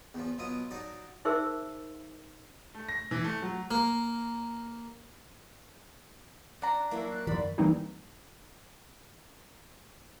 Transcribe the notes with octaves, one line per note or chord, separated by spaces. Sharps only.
E2 F3
B2 F#3 F4 D#6
F#3 D#4 D5 A5
D#4 G#4 A#4 C5 E5 E6
A3
A#6
E3
A3
F#3
A#3
D4 F#5 A#5
F#3 A#3 E4
F#6
F#2 D#3 E3 D5 B5
E3 G3 A#3 C4 D#4 E4